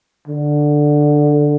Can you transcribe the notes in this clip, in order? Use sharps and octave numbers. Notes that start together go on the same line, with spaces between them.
D3